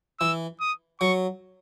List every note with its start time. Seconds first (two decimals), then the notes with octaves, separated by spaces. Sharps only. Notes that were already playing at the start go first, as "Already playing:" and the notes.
0.20 E3 E6
0.60 D#6
1.01 F#3 C#6